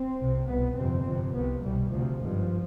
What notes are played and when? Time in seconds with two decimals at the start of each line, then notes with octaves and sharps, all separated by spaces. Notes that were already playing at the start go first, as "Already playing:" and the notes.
Already playing: C4
0.19 C2 C3
0.47 C2 B2 B3
0.75 G1 F2 C3 C4
1.05 G1 F2 C3
1.33 C2 C3 B3
1.61 C2 B2 G3
1.90 D2 C3 F3
2.18 G#1 G2